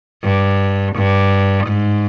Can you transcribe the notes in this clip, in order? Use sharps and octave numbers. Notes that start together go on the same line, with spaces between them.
G2
G2
G#2